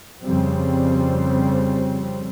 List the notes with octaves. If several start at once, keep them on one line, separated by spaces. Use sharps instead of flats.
F2 C#3 G3 C4